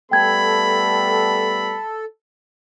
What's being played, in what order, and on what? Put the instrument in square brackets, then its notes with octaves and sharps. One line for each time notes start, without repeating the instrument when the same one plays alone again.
[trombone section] G3 A3 B3 [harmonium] A4 [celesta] G5 G#6 [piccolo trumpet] B5